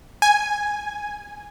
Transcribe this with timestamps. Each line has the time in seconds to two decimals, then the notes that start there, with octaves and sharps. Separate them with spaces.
0.22 G#5